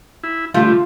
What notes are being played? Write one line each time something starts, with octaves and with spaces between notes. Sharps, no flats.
E4
D3 G3 A3 F4